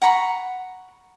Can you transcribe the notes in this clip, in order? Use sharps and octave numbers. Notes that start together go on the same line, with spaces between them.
F#5 A#5 B5 C#6